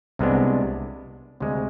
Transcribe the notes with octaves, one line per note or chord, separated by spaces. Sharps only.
C2 C3 G#3 B3 D4
D2 C3 G#3